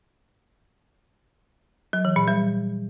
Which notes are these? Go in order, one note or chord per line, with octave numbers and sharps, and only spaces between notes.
F#3
E3
A#2
G3